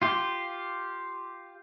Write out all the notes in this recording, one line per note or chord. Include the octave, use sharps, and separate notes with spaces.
F4 G4